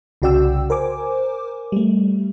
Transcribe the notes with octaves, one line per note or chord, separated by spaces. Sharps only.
C2 C#3 F#4 D5 G5 E6
A#4 C5 G#5 D6
G3 A3